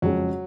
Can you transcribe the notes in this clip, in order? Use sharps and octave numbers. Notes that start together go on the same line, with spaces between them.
F2 C#3 F#3 G#3 C#4